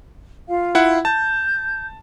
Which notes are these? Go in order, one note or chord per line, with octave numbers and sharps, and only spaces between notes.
F4 F5
E4 F#5
A5 G6